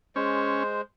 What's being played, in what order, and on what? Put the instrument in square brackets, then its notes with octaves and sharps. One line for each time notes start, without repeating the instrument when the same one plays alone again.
[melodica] G#3 C5 [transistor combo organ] C#4